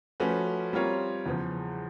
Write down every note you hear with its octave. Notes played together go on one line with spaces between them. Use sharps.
F3 A3 C#4 F#4 B4
G3 C4 F4 A#4 C#5
E2 C#3 F3